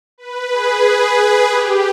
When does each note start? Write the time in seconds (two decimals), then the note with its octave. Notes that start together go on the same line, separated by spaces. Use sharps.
0.18 B4
0.51 G#4
1.49 G4